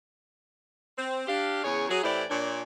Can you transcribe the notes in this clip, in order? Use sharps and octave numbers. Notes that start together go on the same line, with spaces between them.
C4
D4 G4 F5
E2 C#3 G#4 C#5
F#3 G#4
A2 E3 E4 G4 C5 D5
A#2 D4 C#5